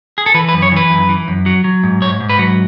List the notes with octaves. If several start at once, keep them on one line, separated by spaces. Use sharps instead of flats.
G#4
A4
E3 B4
B4
F#2
C#5
E3 B4
F#2
E3
F#2
F#3
F#3
G#2
G#2 C#5
G#2
B4
F#3